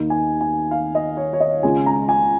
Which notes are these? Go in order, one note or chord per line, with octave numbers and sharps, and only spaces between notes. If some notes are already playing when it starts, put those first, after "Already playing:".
Already playing: D#2 D#3 A#3 D#4
G#5
G#5
F5
D#5
C#5
C#5
D#5
C#2 C#3 G#3 F4 G#5
A#5
G#5